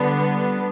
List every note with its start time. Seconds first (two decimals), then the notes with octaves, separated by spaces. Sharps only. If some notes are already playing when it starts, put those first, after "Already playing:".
Already playing: D3 G3 B3 D4